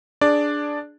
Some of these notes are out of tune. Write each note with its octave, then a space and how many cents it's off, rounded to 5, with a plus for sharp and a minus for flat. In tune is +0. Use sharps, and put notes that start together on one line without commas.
D4 +0 G#4 +0 D5 +0